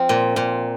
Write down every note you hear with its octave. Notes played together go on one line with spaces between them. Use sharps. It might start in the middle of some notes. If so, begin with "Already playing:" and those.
Already playing: F3 C4
A#2
A#2